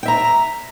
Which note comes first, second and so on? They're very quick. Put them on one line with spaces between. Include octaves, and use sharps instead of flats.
G5 E5 A#5